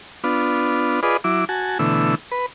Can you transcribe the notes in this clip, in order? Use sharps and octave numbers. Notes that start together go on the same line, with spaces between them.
B3 D4 F4
F4 G#4 B4 D5 D#5
F#3 E4 D6
F#4 G#5 A5
B2 D3 E3 A3 E6
B4